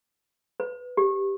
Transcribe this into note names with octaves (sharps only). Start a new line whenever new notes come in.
B4
G4